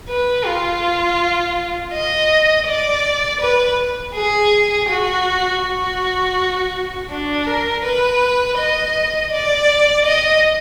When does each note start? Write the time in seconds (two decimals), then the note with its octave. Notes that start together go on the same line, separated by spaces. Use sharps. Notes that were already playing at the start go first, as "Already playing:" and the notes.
0.09 B4
0.46 F4
1.93 D#5
2.67 D5
3.41 B4
4.15 G#4
4.89 F#4
5.63 F#4
7.10 D4
7.47 A#4
7.84 B4
8.58 D#5
9.32 D5
10.06 D#5